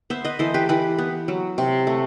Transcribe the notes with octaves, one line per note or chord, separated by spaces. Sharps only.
B3 C5 E5
B4 D#5
E3 A4 C5
G4 B4
E3 G4 B4
B3
F#3
C3
A3